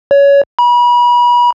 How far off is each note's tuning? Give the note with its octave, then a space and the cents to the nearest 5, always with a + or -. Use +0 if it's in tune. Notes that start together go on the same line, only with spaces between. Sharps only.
C#5 +20
B5 -35